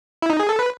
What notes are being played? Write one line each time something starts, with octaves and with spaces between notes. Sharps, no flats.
E4
D#4
G#4
A4
B4